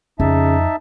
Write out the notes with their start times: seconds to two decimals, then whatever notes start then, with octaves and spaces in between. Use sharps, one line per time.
0.20 F2 C#3 D#4 E5 A5